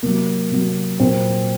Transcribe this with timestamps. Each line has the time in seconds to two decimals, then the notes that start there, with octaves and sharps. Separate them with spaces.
0.03 C3 F#3 A#3
0.51 C3 F#3
1.00 A#2 F#3 C4